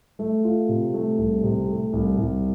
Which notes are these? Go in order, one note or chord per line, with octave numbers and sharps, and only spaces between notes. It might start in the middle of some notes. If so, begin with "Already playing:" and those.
A3
F4
C3
A3
C2
C3
A3
C2
C2